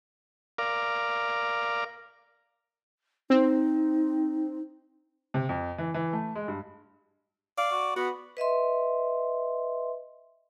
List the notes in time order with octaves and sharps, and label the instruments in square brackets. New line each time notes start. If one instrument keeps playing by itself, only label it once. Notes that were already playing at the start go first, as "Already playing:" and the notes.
[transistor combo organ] A#4 D5 F5
[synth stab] C4 [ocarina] D#4
[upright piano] C3
F2
E3
E3
A3
G#3
G2
[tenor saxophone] D5 [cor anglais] F5
[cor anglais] F#4
[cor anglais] B3 [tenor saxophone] F#4
[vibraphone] B4 D#5 E5 C6